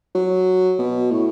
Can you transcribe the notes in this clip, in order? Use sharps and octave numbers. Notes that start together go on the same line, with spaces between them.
F#3
B2
A2